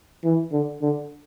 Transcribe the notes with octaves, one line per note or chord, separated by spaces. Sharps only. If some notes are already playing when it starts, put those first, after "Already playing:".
E3
D3
D3